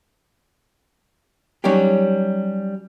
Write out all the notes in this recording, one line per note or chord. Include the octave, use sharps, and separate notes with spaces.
F#3 G3 C#4 D#4 G4